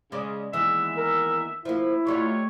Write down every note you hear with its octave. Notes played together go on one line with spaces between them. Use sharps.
C#3 G#3 D5
D#2 E3 G#3 B3 E5
A#4
F3 A#3 E4
F#3 G3 A3 D#4 F4 C#5